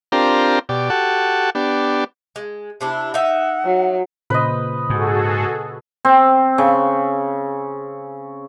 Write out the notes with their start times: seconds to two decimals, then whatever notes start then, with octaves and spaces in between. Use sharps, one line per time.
0.12 C4 D4 F4 G4 A#4 A#5
0.69 B2 G4 D5
0.90 F#4 G4 A4 F#5 A5
1.55 B3 D4 G4
2.36 G#3
2.81 C3 D4 E4
3.14 D#4 E5 F#5
3.65 F#3
4.30 A#2 C#3 B4 C5 D#5
4.90 G#2 F#4 G#4 A4
6.05 C4
6.58 C#3